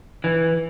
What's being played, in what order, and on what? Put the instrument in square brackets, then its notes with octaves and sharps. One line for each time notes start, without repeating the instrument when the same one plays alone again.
[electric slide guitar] E3